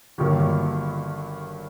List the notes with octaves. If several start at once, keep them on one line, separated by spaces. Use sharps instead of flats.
G1 G2 D#3 F#3 A#3